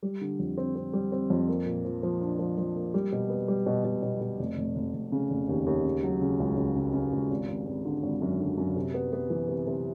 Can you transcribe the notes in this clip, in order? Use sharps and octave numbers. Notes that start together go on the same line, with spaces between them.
G3
D3
F2
C4
C4
G3
C4
F2
A#3
A#2
F3
F3
D4
F3
F3
A#3
G3
B2
B3
G3
B2
B2
B2
B2
F1
F1
F1
F1
C#3
F1
D#2
D#2
C#3
F#3
C#3
C#2
C#2
C#3
C#3
C#2
G#1
G#1
G#1
D3
G#1
F#2
D3
F#2
C3
B3
B3
E3
C3
C3